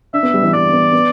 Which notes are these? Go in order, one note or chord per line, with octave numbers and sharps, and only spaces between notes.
D4 E5
B3
G3
E3
G3 D5
B3
B3